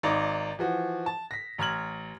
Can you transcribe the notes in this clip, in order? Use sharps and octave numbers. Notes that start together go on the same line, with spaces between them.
G#1 D#4 D5 A#5
E3 F3 F#4
A5
A#6 B6
A1 A#5 F6 G#6 F#7